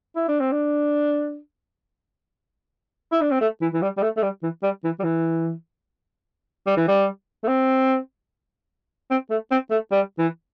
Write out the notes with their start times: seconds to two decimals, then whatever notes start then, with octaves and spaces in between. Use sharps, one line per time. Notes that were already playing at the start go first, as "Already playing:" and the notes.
0.16 E4
0.28 D4
0.40 C4
0.52 D4
3.12 E4
3.21 D4
3.31 C4
3.41 A3
3.61 E3
3.73 E3
3.82 G3
3.98 G3
4.02 A3
4.17 A3
4.23 G3
4.43 E3
4.63 G3
4.84 E3
5.00 G3
5.04 E3
6.67 G3
6.77 E3
6.88 G3
7.44 A3
7.48 C4
9.11 C4
9.30 A3
9.51 C4
9.71 A3
9.92 G3
10.19 E3